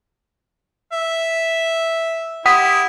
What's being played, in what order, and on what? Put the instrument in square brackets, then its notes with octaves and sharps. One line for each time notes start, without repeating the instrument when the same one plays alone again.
[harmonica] E5
[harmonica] E4 G4 [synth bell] F#5 D#6 B6